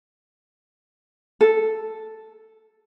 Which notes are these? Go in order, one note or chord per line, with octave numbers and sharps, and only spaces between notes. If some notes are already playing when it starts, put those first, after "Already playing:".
A4